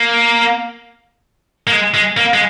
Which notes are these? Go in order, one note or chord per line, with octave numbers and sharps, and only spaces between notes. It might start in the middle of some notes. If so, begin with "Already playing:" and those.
Already playing: A#3
A#3
G#3
G#3
A#3
G#3